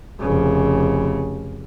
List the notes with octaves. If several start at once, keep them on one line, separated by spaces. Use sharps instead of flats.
F1 C#3